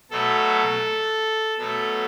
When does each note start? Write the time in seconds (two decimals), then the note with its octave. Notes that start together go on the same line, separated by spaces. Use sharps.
0.11 B2 F#3 A3 A4
1.58 B2 F#3 A3 A4